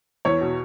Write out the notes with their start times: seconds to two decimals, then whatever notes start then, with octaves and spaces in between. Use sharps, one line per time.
0.25 E2 C#5
0.41 B2